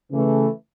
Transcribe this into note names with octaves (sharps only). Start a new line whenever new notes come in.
C#3 E3 A3